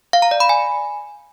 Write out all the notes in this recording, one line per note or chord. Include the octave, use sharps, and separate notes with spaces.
F5
A#5
D5
B5
G#5